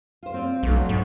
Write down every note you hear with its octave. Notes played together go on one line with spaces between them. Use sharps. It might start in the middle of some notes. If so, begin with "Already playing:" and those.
F4 C5
C4 F4 D5
B1 A3 D4
F#3
G#2